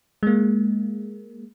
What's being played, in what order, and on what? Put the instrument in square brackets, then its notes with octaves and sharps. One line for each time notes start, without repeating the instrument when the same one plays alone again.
[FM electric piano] G#3 A#3